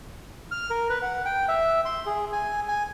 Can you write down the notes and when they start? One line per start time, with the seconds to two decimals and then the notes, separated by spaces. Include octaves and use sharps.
0.51 F6
0.70 A#4
0.90 B4
1.02 F#5
1.25 G5
1.48 E5
1.85 C6
2.06 G#4
2.32 G#5
2.68 G#5